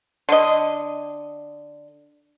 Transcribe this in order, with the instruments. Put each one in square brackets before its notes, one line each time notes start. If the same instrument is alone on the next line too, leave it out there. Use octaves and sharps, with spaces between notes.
[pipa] D3 D#5